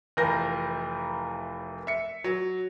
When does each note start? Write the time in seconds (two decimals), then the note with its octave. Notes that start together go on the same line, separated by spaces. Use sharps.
0.17 F1 E3 F3 A#4 G6 A#6
1.87 E5 C#7
2.24 F#3